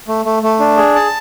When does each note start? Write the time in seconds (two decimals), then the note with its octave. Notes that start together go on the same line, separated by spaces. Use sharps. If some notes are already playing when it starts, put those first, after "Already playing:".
0.08 A3
0.25 A3
0.43 A3
0.60 D4
0.77 G#4
0.95 A5